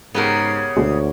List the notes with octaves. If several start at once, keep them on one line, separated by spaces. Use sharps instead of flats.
G#2 C#3 B3 G4 A#4
D2 B2 G#3